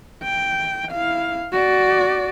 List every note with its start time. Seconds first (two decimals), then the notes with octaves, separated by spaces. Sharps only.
0.23 G5
0.92 E4 F5
1.52 F#4 D5